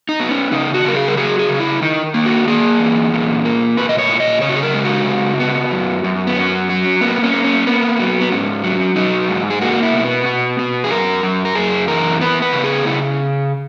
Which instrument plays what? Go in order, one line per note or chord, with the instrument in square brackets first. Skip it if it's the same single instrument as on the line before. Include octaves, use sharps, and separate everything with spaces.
[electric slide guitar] D#4
B3
C#4
C#3 D#4
F#4
C#3 A#4
G#4
A#4
F#3 G#4
G#4
C#3
E4
D#3 D#4
A#3
F#4
A#3 G#4
E2
A#2
A#3
A#2 B4
D#5
C#5
A#2
D#5
C#3 C#5
F#4
G#4
A#4
G#3
F#4
C#3
B3
F#2
F#2
B3
F#2 C#4
F#3
A#3 B3
C#4
A#3
C#4
A#3 B3
F#3
B3
G#2 C#4
F#3
F#3 D#4
G#2
G#4
A#3 F#4
E4
B2
B3
B2
B2
G#4
F#2 A#4
F#2
A#4
F#2 G#4
E3 A#4
B3 B4
B4
C#3
G#4
C#3 E4